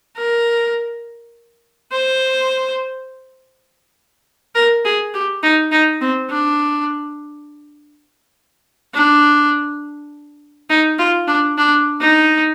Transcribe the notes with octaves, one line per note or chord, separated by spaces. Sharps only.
A#4
C5
A#4
G#4
G4
D#4
D#4
C4
D4
D4
D#4
F4
D4
D4
D#4